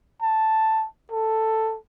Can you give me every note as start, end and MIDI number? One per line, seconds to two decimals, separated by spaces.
0.22 0.86 81
1.11 1.77 69